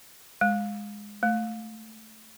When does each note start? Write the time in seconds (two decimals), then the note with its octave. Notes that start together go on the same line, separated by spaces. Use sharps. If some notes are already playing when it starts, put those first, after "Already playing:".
0.41 G#3
1.23 A3